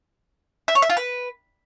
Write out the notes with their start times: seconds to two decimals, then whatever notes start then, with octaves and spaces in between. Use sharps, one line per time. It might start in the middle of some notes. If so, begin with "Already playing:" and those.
0.68 E5
0.75 C#5
0.82 E5
0.90 F4
0.97 B4